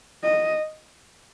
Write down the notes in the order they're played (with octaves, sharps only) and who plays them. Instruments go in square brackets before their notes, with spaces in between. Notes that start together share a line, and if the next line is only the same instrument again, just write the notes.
[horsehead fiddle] D#5